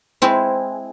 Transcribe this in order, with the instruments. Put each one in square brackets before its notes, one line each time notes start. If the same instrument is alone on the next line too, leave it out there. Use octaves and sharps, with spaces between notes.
[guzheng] G#3 C4 E4